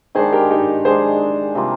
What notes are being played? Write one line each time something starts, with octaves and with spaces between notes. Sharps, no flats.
D#3 G#3 D4 G#4 C5
G4 A#4
D#4 G4
D#3 G#3 D4 G#4 C5
C3 G3 A#3 F4